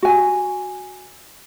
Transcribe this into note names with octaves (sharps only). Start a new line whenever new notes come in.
F#4 G#5